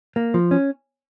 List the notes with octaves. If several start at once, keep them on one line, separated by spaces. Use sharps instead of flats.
A#3
F3
C#4